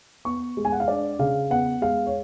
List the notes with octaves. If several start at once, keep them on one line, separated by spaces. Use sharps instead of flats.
B3 C#6
G#3
G#5
F#5
F5
D4 D5
C#3 F5
B3 F#5
G#3 F5
C#5